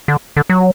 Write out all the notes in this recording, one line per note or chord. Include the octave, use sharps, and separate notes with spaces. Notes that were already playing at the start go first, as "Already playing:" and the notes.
D3
D3
F#3